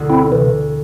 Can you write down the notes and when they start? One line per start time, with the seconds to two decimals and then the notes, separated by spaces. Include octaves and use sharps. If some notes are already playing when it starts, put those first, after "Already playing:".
Already playing: E1 D2 D3
0.10 C4 E4
0.32 C3 E3